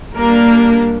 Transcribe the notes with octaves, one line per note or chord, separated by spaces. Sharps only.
G3 A#3 D4 A#4